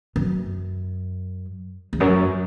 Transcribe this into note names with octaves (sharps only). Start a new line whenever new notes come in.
F#2
E2
F#2